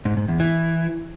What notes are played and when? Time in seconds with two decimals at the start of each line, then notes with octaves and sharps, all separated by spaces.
0.05 G#2
0.17 G#2
0.28 E2
0.40 E3